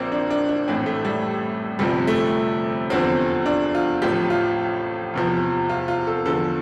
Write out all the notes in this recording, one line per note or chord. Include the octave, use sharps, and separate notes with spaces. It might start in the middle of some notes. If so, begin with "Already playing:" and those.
Already playing: A#1 A#2 F3 A#3 C4
D4
D4
D4
A1 A2 E3 C4
A3
G3
G1 F2 C3 F3 G3
A3
F1 E2 D3 F3 C4
D4
F4
A1 A2 F3 G4
F4
F1 E2 C3 F3
F4
F4
A4
E2 D3 F3 A4